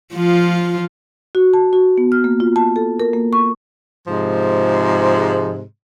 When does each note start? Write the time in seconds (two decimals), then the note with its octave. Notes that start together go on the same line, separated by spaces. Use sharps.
0.14 F3 F4
1.35 F#4
1.54 A5
1.73 F#4
1.98 B3
2.12 F6
2.24 A#3
2.40 F4
2.56 A5
2.76 A4
3.00 A#4
3.13 A#3
3.33 C#6
4.07 G#2 C3 F3 G#3